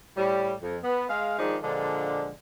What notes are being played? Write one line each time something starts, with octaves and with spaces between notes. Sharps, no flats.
A2 G3
F2
B3
G#3 F5
D#3 F3 G#3 D4 D#4
A#2 D3 F3 G#3 D4